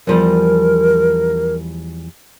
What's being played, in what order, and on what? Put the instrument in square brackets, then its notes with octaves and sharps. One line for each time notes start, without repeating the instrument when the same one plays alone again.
[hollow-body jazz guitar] E2 F3 G3 [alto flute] A#4